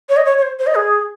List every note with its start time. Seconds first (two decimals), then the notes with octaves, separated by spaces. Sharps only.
0.09 C#5
0.17 D#5
0.25 C#5
0.38 C#5
0.42 C5
0.59 C5
0.67 D#5
0.75 G#4